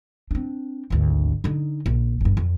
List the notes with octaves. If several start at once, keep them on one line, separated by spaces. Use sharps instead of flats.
C4 D4
G#1 D2
D3 D#4
A#1
G1 G2
F2